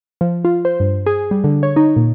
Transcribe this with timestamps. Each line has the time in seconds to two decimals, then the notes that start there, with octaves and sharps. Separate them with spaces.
0.21 F3
0.45 F4
0.65 C5
0.80 G2
1.06 G#4
1.31 G3
1.44 D3
1.63 C#5
1.76 D#4
1.96 A#2